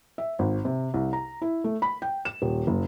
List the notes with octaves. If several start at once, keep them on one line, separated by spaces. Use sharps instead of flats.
E5
G#1
C3
C2
A#5
E4
A3
B5
G5
E7
D#1
F#1